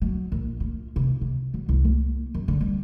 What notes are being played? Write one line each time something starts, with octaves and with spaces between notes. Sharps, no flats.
F#3
A#1
F4
C3
C3
F#3
C2
A#3
F#2
D3
G3